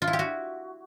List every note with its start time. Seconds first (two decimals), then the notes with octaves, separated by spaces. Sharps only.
0.02 F4
0.07 E4
0.13 G4
0.19 F#4